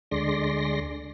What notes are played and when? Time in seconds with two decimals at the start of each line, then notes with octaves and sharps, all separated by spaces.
0.11 D2 D3 G#3 D5 C6 A#6